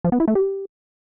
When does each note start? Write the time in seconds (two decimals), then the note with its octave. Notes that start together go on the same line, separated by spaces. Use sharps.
0.04 F3
0.12 B3
0.20 E4
0.28 A3
0.35 G4